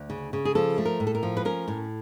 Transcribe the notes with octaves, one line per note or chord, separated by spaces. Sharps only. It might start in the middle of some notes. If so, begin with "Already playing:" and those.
Already playing: D2
C#3
C#3
G#4
F3 A4
A3
A#4
A2
A4
A#4
F3
B4
C#4 A#4
A2